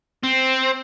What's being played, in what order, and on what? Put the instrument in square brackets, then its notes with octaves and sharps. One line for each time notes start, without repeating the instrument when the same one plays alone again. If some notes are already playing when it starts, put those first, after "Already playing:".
[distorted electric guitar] C4